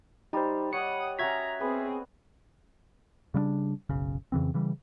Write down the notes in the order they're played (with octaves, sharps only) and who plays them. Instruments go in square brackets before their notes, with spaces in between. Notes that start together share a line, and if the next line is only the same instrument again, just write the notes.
[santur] G3 [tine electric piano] D#4 C5
[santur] C#5 D#5 [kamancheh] F#5 D#6 [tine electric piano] C#7
[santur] C#4 F#4 [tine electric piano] E5 G#6 B6 [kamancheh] A#5
[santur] B3 [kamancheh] C4 G#4
[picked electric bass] C#3 G3 A#3 D4
F#1 B1 C#3
F2 C#3 E3 C4
C#3 E3 G3